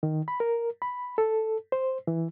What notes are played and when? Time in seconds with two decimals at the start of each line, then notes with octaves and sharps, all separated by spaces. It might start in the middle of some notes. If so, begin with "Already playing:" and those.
0.03 D#3
0.28 B5
0.40 A#4
0.82 B5
1.18 A4
1.72 C5
2.07 E3